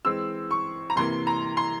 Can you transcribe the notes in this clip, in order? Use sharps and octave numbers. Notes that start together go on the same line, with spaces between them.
E3 G#3 C4 E6
C#6
A#5
C3 E3 A#3 C6
A#5
C6